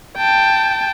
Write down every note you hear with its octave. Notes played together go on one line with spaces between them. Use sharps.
G5 A5